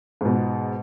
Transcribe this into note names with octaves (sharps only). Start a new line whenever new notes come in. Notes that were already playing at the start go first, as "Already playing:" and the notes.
G#2 B2